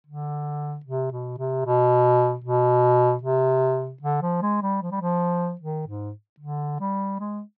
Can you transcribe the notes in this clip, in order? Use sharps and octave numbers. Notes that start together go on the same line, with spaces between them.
D3
C3
B2
C3
B2
B2
C3
D3
F3
G#3
G3
F3
G3
F3
D#3
G#2
D3
G3
G#3